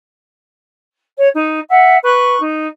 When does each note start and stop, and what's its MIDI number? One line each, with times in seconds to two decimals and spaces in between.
1.17 1.28 73
1.35 1.61 63
1.68 1.98 76
1.68 1.98 78
2.03 2.39 71
2.03 2.39 85
2.03 2.39 90
2.42 2.68 63